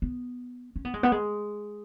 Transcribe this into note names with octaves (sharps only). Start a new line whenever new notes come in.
B3
C#4
B3
G#3
B3
G#3